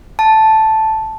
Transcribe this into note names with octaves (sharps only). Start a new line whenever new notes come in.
A5